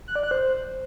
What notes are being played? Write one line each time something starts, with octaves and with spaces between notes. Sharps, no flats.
F#6
D5
F#6
C5